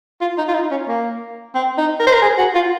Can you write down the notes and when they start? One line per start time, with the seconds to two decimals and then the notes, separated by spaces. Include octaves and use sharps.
0.21 F4
0.38 D#4
0.48 F4
0.55 D#4
0.71 C#4
0.88 A#3
1.55 C4
1.78 D#4
2.00 A#4
2.07 C5
2.13 A#4
2.22 G#4
2.38 F#4
2.55 F4